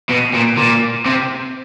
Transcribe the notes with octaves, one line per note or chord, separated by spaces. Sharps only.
B2
A#2
A#2
C3